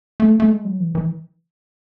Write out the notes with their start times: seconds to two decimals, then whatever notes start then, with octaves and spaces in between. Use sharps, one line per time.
0.20 A3
0.40 A3
0.50 G#3
0.65 F#3
0.80 E3
0.95 E3